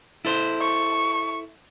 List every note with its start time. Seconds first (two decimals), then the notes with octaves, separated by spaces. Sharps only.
0.25 E4 A4 C5
0.61 C#6